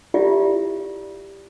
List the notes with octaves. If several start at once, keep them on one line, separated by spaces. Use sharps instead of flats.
E4 F4 G4 D5 E5